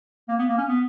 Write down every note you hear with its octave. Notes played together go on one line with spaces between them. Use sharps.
A#3
B3
A#3
C#4
B3